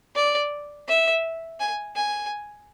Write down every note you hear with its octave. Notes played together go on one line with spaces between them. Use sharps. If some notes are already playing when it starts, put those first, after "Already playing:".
D5
E5
G#5
G#5